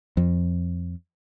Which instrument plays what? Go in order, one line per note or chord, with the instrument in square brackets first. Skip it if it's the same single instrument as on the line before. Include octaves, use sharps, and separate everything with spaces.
[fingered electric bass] F2